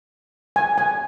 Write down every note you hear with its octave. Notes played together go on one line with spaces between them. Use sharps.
G#5
G#5